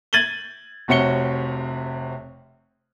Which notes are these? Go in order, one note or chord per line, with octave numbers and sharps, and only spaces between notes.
G#6 A6 D#7 F#7 G7
F1 C3 F#4 C#5 C#7 G7